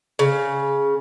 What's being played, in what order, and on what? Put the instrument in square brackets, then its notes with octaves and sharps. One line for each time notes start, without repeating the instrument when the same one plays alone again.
[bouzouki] C#3